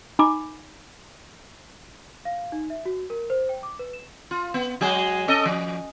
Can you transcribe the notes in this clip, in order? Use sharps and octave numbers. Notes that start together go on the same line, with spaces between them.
D#4 G#5 B5 D6
F5
D#4
E5
F#4
A#4
C5
G5
D6
B4
E7
F4
B3
F#3 G#3 G#4
C#4 A4 D#5
F3